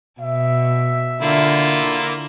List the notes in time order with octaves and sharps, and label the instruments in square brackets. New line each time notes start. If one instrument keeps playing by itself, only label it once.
[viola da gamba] B2 [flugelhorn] E5
[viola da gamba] D3 [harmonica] A#3 E4 F4